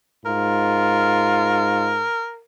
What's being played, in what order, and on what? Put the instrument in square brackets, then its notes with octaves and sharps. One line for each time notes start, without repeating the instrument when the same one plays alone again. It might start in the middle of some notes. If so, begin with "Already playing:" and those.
[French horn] G#2 [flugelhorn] F4 [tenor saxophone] A#4